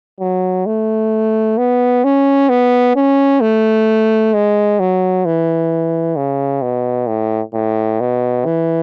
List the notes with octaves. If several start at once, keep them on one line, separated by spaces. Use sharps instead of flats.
F#3
A3
B3
C#4
B3
C#4
A3
G#3
F#3
E3
C#3
B2
A2
A2
B2
E3